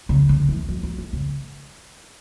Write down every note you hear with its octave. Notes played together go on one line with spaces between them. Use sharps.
C#3
D3
E3
F#3
F#3
E3
C#3